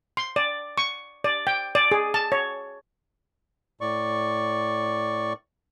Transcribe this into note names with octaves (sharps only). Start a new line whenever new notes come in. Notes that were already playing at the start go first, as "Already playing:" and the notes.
C6
D5
C#6
D5
G5
D5
G#4
A5
C#5
A2 D5 C#6